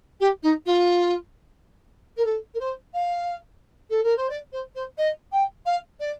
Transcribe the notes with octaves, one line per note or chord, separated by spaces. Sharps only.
G4
D#4
F4
A#4
A4
A#4
C5
F5
A4
A#4
C5
D5
C5
C5
D#5
G5
F5
D5